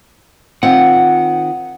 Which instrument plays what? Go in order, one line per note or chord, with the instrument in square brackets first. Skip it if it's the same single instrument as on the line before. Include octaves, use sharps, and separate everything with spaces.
[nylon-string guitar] D#3 C4 F4 [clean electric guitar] F#5